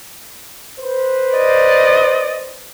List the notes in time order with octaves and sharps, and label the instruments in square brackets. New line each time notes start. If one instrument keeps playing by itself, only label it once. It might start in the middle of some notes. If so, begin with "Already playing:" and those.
[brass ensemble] B4 C5
[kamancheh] D5 D#5